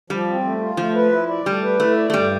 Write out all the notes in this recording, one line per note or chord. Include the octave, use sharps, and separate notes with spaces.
F3 G3
C4
A3
F4
F3 A3
B4
E4
D5
G3 A3
B4
A3 E4
D5
A3
G2 G3